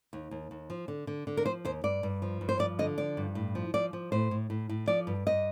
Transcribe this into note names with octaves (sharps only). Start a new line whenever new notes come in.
D#2
D#2
D#2
F3
D3
D3
D3
A#4
F3 C5
D#2 C5
G2 D5
G2
F3
G2
C5
F3 D5
D3 D#5
F3 D5
G2
A2
F3
F3 D5
F3
A2 C5
A2
A2
A2
F3 D5
G2
G2 D#5